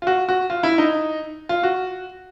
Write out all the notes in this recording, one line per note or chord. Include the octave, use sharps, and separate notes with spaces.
F4
F#4
F#4
F4
E4
D#4
F4
F#4